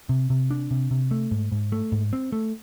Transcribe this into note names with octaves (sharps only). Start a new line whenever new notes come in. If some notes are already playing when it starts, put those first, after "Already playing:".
C3
C3
D4
C3
C3
A3
G#2
G#2
A3
G#2
C4
A3